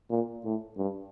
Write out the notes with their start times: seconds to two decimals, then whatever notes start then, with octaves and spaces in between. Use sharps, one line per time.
0.10 A#2
0.44 A2
0.77 G2